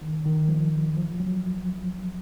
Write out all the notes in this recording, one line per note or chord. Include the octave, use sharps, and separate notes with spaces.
D#3
D#3
F3
F3
F#3